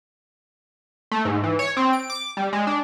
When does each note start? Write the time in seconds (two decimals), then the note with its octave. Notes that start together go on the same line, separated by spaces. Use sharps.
1.12 A3
1.25 G#2
1.44 E3
1.59 C#5
1.77 C4
1.93 D7
2.10 D6
2.37 G3
2.53 G#3
2.67 D4